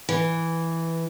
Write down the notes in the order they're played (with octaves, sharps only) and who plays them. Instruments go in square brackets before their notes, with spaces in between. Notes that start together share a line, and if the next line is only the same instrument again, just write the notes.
[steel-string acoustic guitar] E3